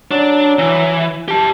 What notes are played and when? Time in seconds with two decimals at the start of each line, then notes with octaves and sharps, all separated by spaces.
0.11 F#3 D4
0.59 E3
1.28 G4 A5